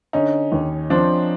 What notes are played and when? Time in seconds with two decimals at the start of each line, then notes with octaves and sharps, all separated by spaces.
0.13 D3 C#4 D#4
0.52 D#2
0.90 F3 C4 D4